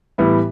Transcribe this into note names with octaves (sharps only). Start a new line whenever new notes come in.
A2 E3 G3 B3 E4